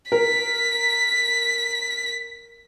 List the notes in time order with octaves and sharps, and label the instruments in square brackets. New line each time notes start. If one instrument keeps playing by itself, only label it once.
[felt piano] A#4 [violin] B6